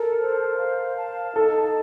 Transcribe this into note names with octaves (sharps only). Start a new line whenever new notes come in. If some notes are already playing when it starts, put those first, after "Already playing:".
Already playing: A4 A#4
C5
F5
A5
D#4 A4